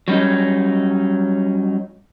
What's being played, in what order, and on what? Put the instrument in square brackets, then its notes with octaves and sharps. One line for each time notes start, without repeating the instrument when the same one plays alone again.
[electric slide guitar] F#3 G3 C#4 D#4